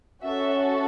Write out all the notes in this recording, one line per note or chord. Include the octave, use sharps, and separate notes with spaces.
C#4 F#4 A4 E5